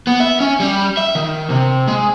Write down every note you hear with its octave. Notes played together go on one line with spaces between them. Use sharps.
B3
E5
C#4
G3
E5
D#3
C3
G#3